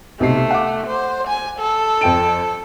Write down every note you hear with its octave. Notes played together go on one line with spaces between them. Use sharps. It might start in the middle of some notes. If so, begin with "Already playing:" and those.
B1 C3 A3 C7
F#5 D6
C5
G#5
A4
F2 G5 D7